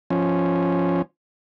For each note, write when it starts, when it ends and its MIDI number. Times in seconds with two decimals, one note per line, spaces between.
0.10 1.02 53
0.10 1.02 61